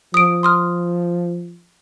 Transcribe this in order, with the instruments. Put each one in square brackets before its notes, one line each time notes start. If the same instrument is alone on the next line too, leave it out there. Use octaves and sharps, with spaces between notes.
[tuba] F3 [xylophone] D#6 D7
[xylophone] C6 D#6 F6